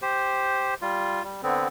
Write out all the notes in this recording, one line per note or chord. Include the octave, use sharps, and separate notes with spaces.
G4 C5
G3 F4
G3
D3 B3 C4